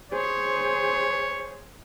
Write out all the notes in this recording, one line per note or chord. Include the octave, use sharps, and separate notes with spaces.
G#4 C5 C#5